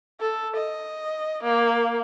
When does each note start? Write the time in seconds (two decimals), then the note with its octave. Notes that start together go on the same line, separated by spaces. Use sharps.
0.21 A4
0.57 D#5
1.43 A#3